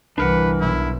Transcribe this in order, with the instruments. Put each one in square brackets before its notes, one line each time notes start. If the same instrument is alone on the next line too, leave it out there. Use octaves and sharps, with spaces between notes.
[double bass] G1 C2 [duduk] E3 [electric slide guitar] D4 A#4 F#5 [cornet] B4
[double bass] B1 [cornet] E4